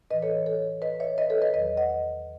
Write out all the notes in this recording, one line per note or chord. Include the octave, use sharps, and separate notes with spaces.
A2 E3 B4 D#5
A4 C#5
A4 C#5
B4 D#5
C#5 E5
B4 D#5
A4 C#5
B4 D#5
E2 D#3 F#3 B4 D#5
D#5 F#5